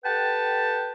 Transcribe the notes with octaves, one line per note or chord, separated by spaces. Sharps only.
G4 A4 B4 F#5 G5 A5